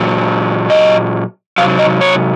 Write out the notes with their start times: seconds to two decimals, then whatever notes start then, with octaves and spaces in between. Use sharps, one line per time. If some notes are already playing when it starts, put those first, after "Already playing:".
Already playing: A#2 F#3
0.70 D#5
1.58 C3 F#3 F5
1.79 D#5
2.01 C#5